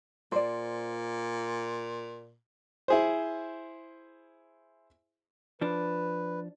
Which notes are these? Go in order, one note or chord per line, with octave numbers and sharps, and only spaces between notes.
A#2 C5 D5
E4 G#4 C5
F3 D4 B4